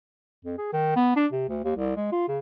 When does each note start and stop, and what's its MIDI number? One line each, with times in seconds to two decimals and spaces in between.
0.45 0.56 41
0.57 0.72 68
0.73 0.94 51
0.96 1.12 59
1.16 1.26 62
1.32 1.47 48
1.49 1.63 38
1.64 1.71 39
1.76 1.94 36
1.96 2.10 56
2.12 2.27 65
2.28 2.39 49